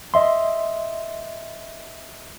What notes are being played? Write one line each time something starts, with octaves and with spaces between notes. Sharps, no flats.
D#5 E5 C6